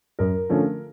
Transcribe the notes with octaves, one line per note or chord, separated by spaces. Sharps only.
F#2 A#4
D3 F3 A3 C#4